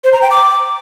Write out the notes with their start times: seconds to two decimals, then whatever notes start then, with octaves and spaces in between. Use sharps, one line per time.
0.04 C5
0.13 A#5
0.22 G5
0.31 D6